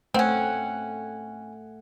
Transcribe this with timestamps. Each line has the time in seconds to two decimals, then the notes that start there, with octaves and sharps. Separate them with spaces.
0.14 A3 C4 C#4 F#5